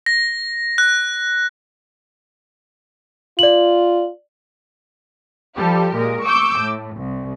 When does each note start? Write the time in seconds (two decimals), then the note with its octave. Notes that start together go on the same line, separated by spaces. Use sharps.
0.06 A#6
0.78 F#6
3.39 F4 D5 F#7
5.57 F3 G3 G4 A4
5.95 A#2 G#3 A#4
6.26 C#6 D6 E6 G6
6.61 A2
6.97 C2